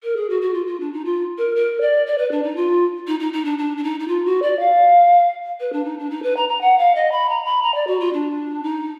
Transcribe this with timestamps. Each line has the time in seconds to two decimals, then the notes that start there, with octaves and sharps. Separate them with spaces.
0.03 A#4
0.16 G#4
0.29 F#4
0.41 F#4
0.54 F4
0.66 F4
0.80 D4
0.93 D#4
1.05 F4
1.38 A#4
1.55 A#4
1.81 D5
2.06 D5
2.18 B4
2.31 D4
2.43 D#4
2.56 F4
3.07 D#4
3.19 D#4
3.33 D#4
3.45 D4
3.58 D4
3.77 D4
3.83 D#4
3.99 D#4
4.08 F4
4.25 F#4
4.42 D5
4.59 F5
5.60 B4
5.72 D4
5.84 D#4
5.98 D4
6.10 D#4
6.23 B4
6.36 A#5
6.49 A#5
6.61 F#5
6.78 F5
6.95 D#5
7.11 B5
7.29 A#5
7.45 B5
7.62 A#5
7.74 D5
7.87 F#4
8.00 F4
8.13 D4
8.63 D#4